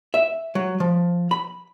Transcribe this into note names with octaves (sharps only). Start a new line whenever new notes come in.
E5
F#3
F3
B5